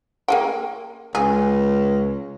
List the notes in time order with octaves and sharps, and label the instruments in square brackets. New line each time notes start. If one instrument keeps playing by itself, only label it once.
[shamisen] A#3 G#4 G5
[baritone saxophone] C#2 [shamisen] G#4